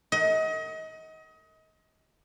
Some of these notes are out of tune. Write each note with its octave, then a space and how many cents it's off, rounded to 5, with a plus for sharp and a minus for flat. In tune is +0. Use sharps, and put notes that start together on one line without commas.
A#4 -40 D#5 +30 F#5 +25